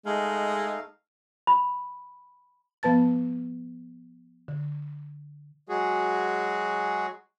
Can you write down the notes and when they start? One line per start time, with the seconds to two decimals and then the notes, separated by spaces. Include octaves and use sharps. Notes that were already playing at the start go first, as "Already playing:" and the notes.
0.06 G#3 A3 D#4 F5
1.47 B5
2.83 F3 B3 B4 A5 A6
4.48 D3
5.69 F#3 G#3 F#4 G#4